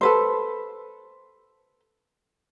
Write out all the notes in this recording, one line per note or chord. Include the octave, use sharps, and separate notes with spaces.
A4 B4 C5